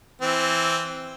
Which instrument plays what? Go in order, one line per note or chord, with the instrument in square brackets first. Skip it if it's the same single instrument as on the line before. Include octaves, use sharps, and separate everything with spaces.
[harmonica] E3 C4